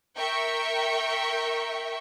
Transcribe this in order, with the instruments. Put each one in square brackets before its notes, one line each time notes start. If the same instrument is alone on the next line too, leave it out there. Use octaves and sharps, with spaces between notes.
[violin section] A#4 E5 G5 C#6